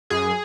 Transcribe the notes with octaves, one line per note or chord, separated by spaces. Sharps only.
F#2 G#4